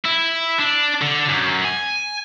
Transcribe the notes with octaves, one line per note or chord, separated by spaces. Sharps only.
E4
D4
D3
F#2
G#5